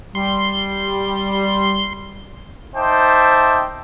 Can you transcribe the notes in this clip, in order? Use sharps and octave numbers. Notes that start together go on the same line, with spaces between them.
G3 C6
D#4 C5 E5 G5 A5 D6